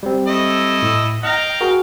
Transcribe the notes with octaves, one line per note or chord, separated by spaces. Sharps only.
G3 C4
A3 E4 D#5
A2
D#5 F5 G5 A#5 F6 A#6
F#4 G#4 A#4